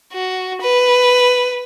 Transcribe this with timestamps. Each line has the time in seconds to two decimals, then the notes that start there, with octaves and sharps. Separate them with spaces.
0.13 F#4
0.61 B4